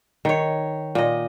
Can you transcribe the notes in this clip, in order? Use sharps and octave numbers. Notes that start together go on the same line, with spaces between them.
D#3 C#5
A#2 D#5